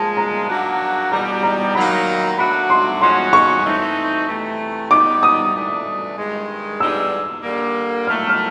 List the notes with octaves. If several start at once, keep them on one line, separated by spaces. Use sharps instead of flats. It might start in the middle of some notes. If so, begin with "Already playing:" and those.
Already playing: A#2 F3 G#3 A5
A#5
F#3 A#3 D4 F#4
E2 B2 G3 A#5
A#5
D#2 D#3 F#3 A#3 D#4 B5
F#3 A3 D4 F#4 B5
C6
F3 G#3 C#4 F#4 C6
C#6
E3 A3 C4 D#4
C3 E3 A3
G3 B3 D#4 D6
D#6
E3 A3 D4
G2 D#3 G#3
D3 G3 B3 D#4 G#4 E6
D3 G3 A#3
A2 F#3 A3 F6
F6